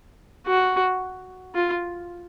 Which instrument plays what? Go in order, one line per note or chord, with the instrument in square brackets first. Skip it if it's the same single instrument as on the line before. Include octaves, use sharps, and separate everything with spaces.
[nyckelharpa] F#4
F4